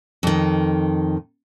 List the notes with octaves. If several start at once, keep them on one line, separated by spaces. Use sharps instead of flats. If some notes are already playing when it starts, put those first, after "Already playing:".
F2 D#3